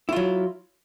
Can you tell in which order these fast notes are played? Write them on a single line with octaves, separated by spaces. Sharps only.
E4 F4 F#3